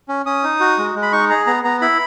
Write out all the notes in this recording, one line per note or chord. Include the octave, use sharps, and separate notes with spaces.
C#4
C#4 D#6
D#4
F#4
G#3
G#3
B5
D#4 C#6
G#4 A#5
B3 A#5
B3 A#5
E4 B5